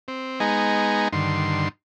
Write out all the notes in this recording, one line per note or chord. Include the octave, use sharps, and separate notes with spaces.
C4
G#3 B3 D#4 G#5 A#5
G2 D3 D#3 C6